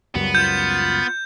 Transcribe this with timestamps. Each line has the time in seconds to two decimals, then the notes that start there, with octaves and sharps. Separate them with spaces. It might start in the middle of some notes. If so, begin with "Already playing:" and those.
0.15 C#2 F#2 G3 B3
0.35 F4 G6